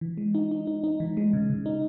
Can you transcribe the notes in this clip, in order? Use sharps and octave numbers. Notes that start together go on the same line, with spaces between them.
E3
G#3
D#4
D#4
D#4
D#4
E3
G#3
C#3
C#3
D#4